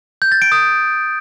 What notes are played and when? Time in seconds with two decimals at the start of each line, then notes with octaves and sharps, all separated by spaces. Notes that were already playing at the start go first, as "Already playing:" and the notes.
0.22 G6
0.32 A6
0.42 D7
0.52 D#6